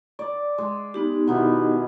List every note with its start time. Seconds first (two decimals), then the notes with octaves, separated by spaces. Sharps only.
0.19 D5
0.58 G#3
0.94 B3 D#4 G4
1.27 B2 D#3 E4